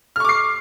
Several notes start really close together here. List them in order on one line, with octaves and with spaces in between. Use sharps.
F6 C#6 D6 C7